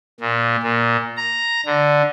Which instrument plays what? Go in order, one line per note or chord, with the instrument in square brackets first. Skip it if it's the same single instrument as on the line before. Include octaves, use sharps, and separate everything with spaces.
[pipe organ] A#2
A#2
A#5
D3